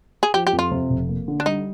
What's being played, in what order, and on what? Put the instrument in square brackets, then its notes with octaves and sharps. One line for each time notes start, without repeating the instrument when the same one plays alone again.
[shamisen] G#4
[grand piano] F3 [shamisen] G4
[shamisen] G4
[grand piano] F2
[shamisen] F4
[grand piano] C3
F1
A#3
D3
[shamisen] D4
[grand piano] G3 [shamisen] D#4